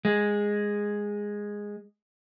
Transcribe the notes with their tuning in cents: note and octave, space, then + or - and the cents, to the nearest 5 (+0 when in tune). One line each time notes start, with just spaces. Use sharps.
G#3 -10